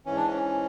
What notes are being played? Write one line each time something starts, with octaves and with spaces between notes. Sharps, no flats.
G#2 E3 C#4
D4
C#4